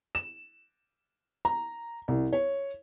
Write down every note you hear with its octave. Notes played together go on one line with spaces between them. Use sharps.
E7
A#5
C2
C#5